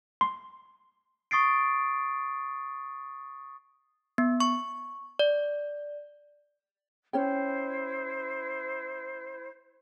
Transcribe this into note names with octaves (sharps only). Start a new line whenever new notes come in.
C6
C#6 D#6 A6 C7 D7
B3
C#6
D5
C#4 E4 C5 C#5 G5